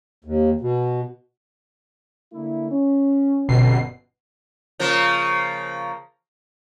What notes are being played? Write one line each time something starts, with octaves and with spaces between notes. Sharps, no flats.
D#2
B2
D3 A#3 E4
C#4
G1 F#2 B2 C4 C#4 C7
C#3 F3 A#3